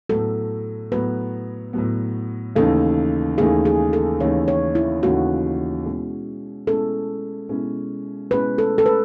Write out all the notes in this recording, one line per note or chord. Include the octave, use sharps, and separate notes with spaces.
A2 F#3 B3 A4
A2 F#3 B3 B4
A2 F#3 B3
D#2 C#3 E3 A3 D#4 A4
D#2 C#3 E3 A3 D#4 G#4
G#4
A4
D#2 C#3 E3 A3 D#4 C#5
C#5
E4
D#2 C#3 E3 A3 D#4 F#4
B2 G#3 C#4 E4
B2 G#3 C#4 E4 A4
B2 G#3 C#4 E4
B2 G#3 C#4 E4 B4
A4
A4
B4